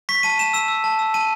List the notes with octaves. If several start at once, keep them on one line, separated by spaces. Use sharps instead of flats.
C#6 B6
A5 D#7
A5 E7
E6 E7
E6
A5
E6
A5 D#7